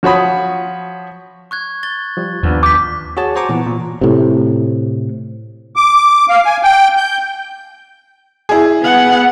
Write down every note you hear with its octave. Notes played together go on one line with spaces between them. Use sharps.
F3 F#4 C#5 B5 D#6
C#6 F#6 G#6
A6 G7
F3 G3
D#2 F3 B3 D4
D6 G6 B6
F#4 G#4 C#5 A5
F#4 C5 G#5 A#5 C#6 D6
A#2 E3 B3
A#2
A2 C3
D6
F5
G#5
G5
G6
E4 G#4
B3 F#5